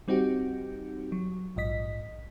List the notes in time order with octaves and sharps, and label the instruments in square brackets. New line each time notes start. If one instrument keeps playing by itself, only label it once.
[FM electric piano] G3 C4 D#4 F#4 G4
F#3
A#1 G#2 D#5 B6